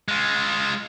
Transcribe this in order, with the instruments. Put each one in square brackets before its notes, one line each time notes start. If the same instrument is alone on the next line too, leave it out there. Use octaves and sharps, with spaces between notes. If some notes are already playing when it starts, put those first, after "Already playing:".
[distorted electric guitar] G#3 F4